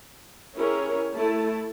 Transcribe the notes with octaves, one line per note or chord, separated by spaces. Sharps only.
C#4 E4 G4 G#4 A#4 C#5
A3 E4 A5